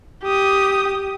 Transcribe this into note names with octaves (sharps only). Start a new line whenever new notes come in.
G4 D#6